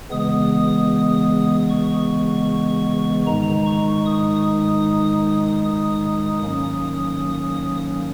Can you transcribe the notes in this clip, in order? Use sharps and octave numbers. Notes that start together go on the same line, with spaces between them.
C#3 E3 G#3 B3 D#6
C#6
G#2 D#3 G#3 D#4 A#5
C#6
D#6
D#6
G#2 D#3 F#3 A#3 C#4